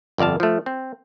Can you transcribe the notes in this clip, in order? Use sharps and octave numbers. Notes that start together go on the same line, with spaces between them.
G1 F2 D5 F5 A5
F3 A3
C4